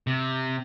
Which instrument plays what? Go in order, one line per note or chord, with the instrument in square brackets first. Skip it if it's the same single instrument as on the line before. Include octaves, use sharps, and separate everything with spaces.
[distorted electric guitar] C3